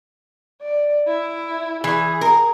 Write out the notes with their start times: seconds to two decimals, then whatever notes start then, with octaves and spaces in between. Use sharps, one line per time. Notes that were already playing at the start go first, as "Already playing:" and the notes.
0.61 D5
1.07 E4
1.84 E3 G#4
2.21 A#4